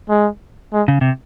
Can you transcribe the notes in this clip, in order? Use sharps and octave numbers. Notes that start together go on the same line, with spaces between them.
G#3
G#3
C#3
C3